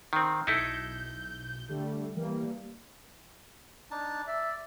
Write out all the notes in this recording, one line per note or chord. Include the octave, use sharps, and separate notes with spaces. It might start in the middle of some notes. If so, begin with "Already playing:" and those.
D#3 C4
B1 D#4 E4 A4 G6
D3 G3 A3
E3 G3 A#3
D4 D#4 A5
D5 E5